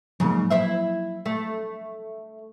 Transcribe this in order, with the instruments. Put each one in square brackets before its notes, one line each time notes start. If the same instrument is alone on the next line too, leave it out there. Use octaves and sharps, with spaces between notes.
[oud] G#2 C#3 [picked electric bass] F3 F#3 A#3
[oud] E4 C5 E5
A3